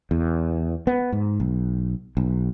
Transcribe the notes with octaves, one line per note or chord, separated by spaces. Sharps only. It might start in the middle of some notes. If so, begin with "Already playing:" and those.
E2
B3
G#2
B1
B1